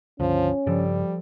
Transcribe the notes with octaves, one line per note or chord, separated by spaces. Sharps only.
C#2 G2 D3 F3 C#4
G2 C#3 F3 G3 A4 D5